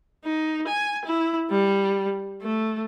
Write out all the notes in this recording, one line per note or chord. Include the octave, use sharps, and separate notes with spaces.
D#4
G#5
E4
G3
A3